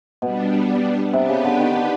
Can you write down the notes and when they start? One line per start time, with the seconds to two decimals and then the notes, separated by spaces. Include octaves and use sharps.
0.22 B2 G3 B3 D4
1.13 C3 B3 D4 G4 B4
1.29 C#3
1.44 D3
1.60 D#3
1.76 D3